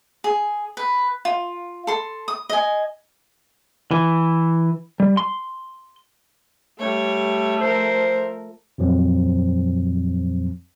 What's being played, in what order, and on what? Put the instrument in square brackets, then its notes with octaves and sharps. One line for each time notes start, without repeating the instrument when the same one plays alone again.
[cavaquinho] G#4
B4
F4
A4 C6
D#6
D#5 G#5
[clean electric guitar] E3
G3
C6
[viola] G3 C#5 [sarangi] A3
[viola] F3 A#4 [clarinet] C5
[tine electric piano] F2 A#2 F3 F#3 C4